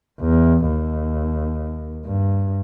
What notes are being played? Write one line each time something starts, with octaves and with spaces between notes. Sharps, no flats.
E2
D#2
G2